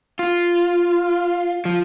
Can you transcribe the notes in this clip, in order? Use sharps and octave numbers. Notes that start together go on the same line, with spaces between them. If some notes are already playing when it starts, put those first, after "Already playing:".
F4
F3